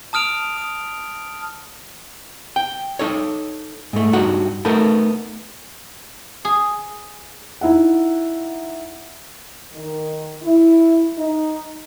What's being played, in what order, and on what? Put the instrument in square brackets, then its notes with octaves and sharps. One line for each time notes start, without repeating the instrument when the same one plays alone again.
[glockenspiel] A5 D#6 F6 D7 F7
D#6
[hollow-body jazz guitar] G5
D#4 A4 C#5
G#2 A3
G2 D#4 F#4 F#5
A3 B3 D#4 A4 A#4
[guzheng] G#4
[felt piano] D#4 E4 E5 F#5
[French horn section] D#3
E4
D#4